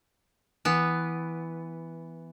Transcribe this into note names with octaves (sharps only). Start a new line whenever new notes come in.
E3 B3